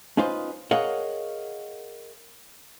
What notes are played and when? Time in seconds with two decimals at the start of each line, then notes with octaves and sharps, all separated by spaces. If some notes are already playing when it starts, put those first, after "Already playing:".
0.17 C#4 D#4 F4 B4 C5 D#5
0.71 G#4 A#4 C#5 D#5 F5 F#5